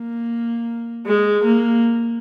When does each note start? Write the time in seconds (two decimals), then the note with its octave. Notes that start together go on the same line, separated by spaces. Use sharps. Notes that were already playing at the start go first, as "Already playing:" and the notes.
Already playing: A#3
1.07 G#3
1.44 A#3